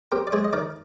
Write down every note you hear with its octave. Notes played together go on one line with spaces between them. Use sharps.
C4 G4 A#4
D5
G#3 G#4 C5
D#5
D#3 A#4 D5